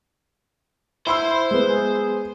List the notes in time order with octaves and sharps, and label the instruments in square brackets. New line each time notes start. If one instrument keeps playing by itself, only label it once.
[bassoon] E4 [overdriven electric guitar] C5 [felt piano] B5 C6 E6
[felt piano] G#3 B3
[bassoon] G#4